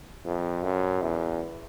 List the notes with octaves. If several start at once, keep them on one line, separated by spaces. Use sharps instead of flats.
F2
F#2
E2